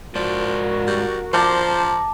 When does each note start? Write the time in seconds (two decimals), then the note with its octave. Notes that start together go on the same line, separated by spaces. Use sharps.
0.15 G#2 F3 F#4 A#4 D5
0.87 G3
1.33 F3 C5 D5 A5 A#5